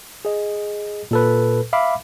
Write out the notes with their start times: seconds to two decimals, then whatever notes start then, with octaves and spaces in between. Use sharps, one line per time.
0.25 G#4 D#5
1.11 A#2 A4 B4
1.73 E5 F5 B5 D6